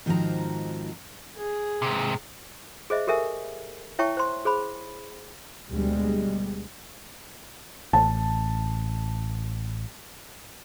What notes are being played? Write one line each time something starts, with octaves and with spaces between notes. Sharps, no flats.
G#2 D#3 F3 C4 F#4 A#5
G#4
G#2 C3
G#4 C5 D#5 E5
G4 A4 A#4 E5 G#5
E4 C#5 E5 G5 A5 C#6
C5 C6
G#4 C5 B5
D2 B2 G3 G#3
A1 A5